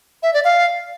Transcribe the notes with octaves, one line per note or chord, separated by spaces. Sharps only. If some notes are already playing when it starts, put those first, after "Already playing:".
E5
D5
F5